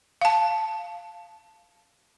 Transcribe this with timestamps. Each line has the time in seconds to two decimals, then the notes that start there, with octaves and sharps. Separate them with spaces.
0.21 F5 A5